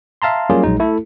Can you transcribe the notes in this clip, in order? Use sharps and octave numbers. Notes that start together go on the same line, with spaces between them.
E5 F5 A5 A#5 C6
F#3 G3 A#3 C#4 F4 G#4
A#1 F#3 G#3 D#4
A3 E4 A4